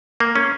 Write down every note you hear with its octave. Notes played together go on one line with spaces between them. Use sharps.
A#3
C#4